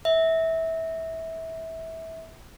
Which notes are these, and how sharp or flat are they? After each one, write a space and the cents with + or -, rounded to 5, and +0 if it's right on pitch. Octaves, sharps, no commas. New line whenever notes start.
E5 -20